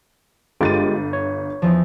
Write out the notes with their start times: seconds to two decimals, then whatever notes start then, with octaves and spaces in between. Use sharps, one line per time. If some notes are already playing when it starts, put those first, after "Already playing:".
0.61 G1 G#3 F4 G4 A6 D7 D#7
1.13 C#5
1.62 E2 F3